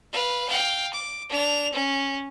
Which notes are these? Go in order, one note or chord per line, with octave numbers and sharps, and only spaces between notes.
B4 F5
F5 G5
D6
D4 F7
C#4